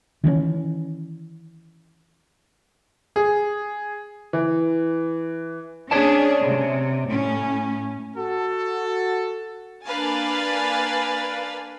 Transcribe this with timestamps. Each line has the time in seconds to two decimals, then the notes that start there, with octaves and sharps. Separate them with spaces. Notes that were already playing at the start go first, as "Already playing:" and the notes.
0.24 D#3 E3 B3 C#4
3.16 G#4
4.33 E3
5.91 C#4 D4 G#4 C#5 D5 A5
6.42 C3
7.06 A2 C#4
8.16 F#4 A4
9.84 A#3 D4 B4 F5 G#5 A6